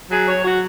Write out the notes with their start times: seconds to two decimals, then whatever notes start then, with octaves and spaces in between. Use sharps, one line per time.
0.10 F#3 G#4
0.27 C#5
0.35 F#3
0.44 F#4